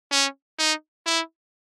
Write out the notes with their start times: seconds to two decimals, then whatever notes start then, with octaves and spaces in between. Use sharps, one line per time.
0.11 C#4
0.59 D#4
1.06 E4